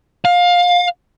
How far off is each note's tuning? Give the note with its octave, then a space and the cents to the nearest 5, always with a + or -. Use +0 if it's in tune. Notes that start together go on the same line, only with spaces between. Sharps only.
F5 +20